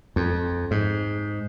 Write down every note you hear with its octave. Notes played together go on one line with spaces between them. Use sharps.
F2
G#2